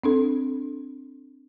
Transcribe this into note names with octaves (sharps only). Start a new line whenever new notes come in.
C4 D4 A4